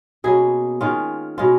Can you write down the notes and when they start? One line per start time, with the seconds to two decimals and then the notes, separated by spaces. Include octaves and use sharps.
0.24 B2 A#3 C#4 G#4
0.81 D#3 G#3 C#4 F4
1.38 B2 G#3 C#4 F4